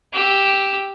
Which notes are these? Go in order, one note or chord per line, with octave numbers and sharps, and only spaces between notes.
G4 E6